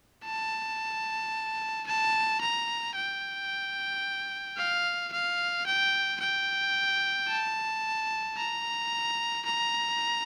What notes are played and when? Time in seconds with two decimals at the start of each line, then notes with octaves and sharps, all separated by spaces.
0.25 A5
1.87 A5
2.41 A#5
2.95 G5
4.57 F5
5.12 F5
5.66 G5
6.20 G5
7.28 A5
8.37 A#5
9.45 A#5